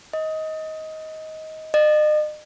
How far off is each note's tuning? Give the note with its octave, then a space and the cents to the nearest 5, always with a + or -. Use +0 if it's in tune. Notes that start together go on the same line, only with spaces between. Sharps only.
D#5 +20
D#5 -40